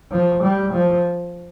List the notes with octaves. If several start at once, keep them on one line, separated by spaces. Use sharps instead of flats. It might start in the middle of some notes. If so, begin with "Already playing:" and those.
F3
G3
F3